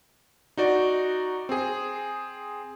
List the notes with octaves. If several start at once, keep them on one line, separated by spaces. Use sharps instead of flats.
D#4 F#4 D5
C4 G#4